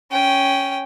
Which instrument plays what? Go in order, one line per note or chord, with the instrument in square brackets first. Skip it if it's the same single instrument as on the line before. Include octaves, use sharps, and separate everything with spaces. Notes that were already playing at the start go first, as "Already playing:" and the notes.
[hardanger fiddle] C#4 G5